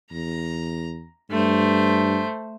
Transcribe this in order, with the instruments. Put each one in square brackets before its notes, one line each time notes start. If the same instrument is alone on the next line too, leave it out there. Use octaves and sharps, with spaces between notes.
[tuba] E2 [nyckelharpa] A#5
[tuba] G2 [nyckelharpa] A3 C5